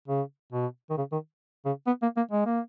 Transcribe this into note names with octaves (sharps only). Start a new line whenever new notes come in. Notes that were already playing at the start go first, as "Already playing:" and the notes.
C#3
B2
D#3
C#3
D#3
C#3
B3
A#3
A#3
G#3
A#3